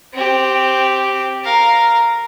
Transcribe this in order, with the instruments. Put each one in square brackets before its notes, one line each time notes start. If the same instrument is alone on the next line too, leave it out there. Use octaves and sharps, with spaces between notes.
[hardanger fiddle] C4 G4
A#4 F5